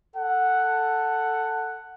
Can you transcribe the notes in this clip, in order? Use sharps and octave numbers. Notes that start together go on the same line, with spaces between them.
A4 F#5